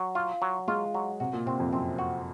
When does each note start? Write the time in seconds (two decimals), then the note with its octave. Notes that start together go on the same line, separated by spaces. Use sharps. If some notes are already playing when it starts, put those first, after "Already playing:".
Already playing: F#3
0.15 F4
0.42 F#3
0.68 G#3 F4
0.94 F#3
1.20 C3 F#4
1.33 A#2
1.46 C3 C4
1.60 F2
1.73 F#2 C4
1.99 F#4